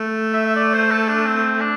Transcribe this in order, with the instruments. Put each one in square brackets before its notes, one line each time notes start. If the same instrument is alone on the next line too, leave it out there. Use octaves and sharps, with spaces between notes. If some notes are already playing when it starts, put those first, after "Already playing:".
Already playing: [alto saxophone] A3
[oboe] E5
E5
D5
C5
A4
D4
C4
D4